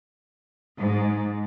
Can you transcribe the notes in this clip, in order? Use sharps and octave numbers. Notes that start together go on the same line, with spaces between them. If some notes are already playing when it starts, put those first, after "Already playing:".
G#2